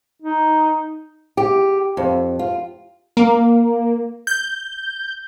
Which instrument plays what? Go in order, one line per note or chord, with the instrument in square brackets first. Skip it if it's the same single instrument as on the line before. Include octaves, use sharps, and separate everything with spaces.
[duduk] D#4
[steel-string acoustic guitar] G4
F2
F4
[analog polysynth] A#3
G6